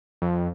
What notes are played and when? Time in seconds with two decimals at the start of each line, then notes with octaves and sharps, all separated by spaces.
0.22 F2